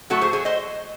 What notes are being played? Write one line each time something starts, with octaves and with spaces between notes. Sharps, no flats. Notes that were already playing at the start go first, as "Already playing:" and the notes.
A2 F#3 A3 F#4 A4
G#4 C5
G#4 C5
C5 D#5